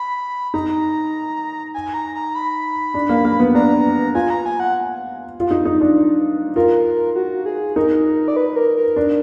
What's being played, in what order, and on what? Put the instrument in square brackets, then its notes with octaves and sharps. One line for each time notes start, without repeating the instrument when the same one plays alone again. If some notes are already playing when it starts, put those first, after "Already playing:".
Already playing: [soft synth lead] B5
[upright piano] D#4 [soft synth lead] A#5
[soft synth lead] G#5
A#5
A#5
B5
[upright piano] D4
A#3
A#3
B3
[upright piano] D4 [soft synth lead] A#5
[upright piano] F4 [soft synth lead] G#5
[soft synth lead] A#5
G#5
F#5
[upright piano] F4
D#4
D#4
D4
[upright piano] F4 [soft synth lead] A#4
[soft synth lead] F#4
G#4
[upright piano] D#4 [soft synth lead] A#4
[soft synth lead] D5
B4
A#4
A#4
[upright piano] D4